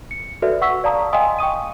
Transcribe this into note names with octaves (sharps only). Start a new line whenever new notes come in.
C#7
F#4 A4 B4 D5 E5
F#5 C#6 E6 B6
D5 F5 A5 A#5 D#6
D#5 F5 G5 G#5 C6 D#6
G5 C#6 D#6 D#7